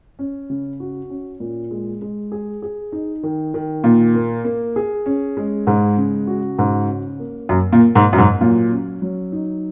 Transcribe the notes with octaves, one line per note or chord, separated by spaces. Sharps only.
C#4
C#3
F#4
C#4
A#2
G#3
G#3
G#4
G#4
D#4
D#3
D#3
A#2 A#3
A#3
A#3
G#4
C#4
G#3
G#2 G#3
C#3
F#4
G#2 C#3
C#4
A#3
F#2 A#3
A#2
A#3
G#2
F#2 A#3
G#2
A#2 F#3
C#4
F#3
D#4